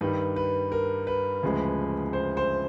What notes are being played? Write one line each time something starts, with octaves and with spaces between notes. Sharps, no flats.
G2 D#3 G3 B4
B4
A#4
B4
D2 C#3 F3 G#3
C5
C5